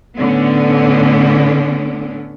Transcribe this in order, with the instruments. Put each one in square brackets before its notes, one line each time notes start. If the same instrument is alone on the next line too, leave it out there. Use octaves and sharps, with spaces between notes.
[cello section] A2 D3 B3 C#4 D4